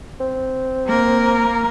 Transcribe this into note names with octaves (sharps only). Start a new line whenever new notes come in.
C4
A#3 A#4